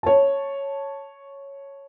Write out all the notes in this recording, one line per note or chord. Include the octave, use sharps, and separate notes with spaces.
C#5 A5